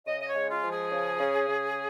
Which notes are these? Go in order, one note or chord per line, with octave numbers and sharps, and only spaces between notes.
C#3 D#5
D#5
C#5
G#3
F4
F3
G#4
C#3
C#3
C#3